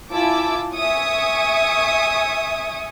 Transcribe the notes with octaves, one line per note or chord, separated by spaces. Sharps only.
E4 F4 G#5 A5 D6 E6
E5 G#5 C#6 D#6